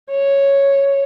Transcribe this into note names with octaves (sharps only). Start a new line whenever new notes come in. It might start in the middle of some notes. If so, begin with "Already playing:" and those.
C#5